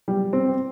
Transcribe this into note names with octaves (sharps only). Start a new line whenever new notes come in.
G3
C4